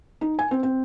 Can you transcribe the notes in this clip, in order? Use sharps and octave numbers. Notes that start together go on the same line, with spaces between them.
D#4
G#5
C4
C4